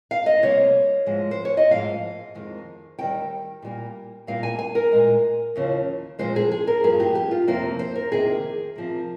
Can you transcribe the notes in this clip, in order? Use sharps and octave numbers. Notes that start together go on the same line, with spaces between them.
F5
D#5
C3 G3 A#3 C#5
G#2 F3 G#3
C5
C#5
D#5
G#2 F3 A#3 F5
F2 D#3 G#3
D#2 D#3 G3 G5
A#2 G3 A#3
A#2 G3 A#3 F5
G#5
G#5
A#4
A#2 G#3
D#2 C#3 F3
A#2 F3 G#3 C5
G#4
G#4
A#4
G2 F3 A#3 G#4
G4
G4
F4
F2 C3 F3 A#3 C5
C5
A#4
F2 C3 D#3 A#3 G#4
C3 F3 A#3